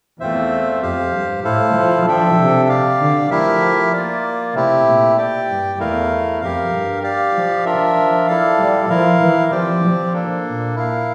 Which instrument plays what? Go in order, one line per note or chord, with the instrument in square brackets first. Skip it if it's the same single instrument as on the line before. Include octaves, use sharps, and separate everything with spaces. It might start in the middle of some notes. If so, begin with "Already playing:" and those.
[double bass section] E2 [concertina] A3 C4 F4 C5 E5
[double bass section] F2 [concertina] G4 C5 F5
[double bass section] G2
[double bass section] A2 [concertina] E4 A4 C5 F5
[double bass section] F3
[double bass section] F3 [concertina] D4 A4 E5 G5
[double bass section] C3
[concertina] G4 D5 F5
[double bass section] D3
[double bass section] F3 [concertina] A3 E4 G4 A#4 E5
[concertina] A#3 F4 A#4 D5
[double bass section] C3 [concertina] A3 C4 E4 G4
[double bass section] A#2
[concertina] G4 D5 G5
[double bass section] G2
[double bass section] E2 [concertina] A3 E4 A#4 F5
[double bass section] F2 [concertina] G4 A#4 F5
[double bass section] G2
[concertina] G4 D5 F5
[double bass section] F3
[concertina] D4 F4 A#4 E5
[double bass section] F3
[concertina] E4 A4 D5 F5
[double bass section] G3
[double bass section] F3 [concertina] E4 A#4 F5
[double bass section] E3
[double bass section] F3 [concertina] C4 G4 D5 G5
[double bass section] F3
[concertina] A#3 D4 A4
[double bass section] A#2
[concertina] E4 A#4 F5